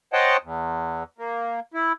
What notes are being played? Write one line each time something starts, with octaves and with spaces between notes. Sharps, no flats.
C5 C#5 D#5 F#5 G5 A5
E2
A#3
E4